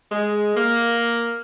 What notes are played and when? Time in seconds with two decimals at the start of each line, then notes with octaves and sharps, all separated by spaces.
0.12 G#3
0.55 A#3